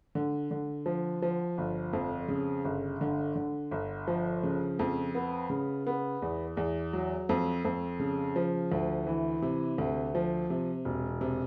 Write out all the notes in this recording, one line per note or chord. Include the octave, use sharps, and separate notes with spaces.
D3
D3
F3
F3
G1
F2
C#3
G1
D3
D3
G1
F3
C#3
F2
B3
C#3
B3
E2
E2
F#3
F2
F2
C#3
F3
D2
E3
C3
D2
F3
C3
E1
C3